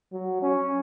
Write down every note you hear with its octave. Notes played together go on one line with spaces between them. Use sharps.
F#3
C#4